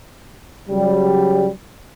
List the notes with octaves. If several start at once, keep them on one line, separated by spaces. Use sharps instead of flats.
C#3 F#3 G3